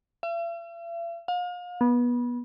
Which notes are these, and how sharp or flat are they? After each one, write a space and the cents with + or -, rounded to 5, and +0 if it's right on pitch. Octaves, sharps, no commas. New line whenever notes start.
E5 +45
F5 +35
B3 -25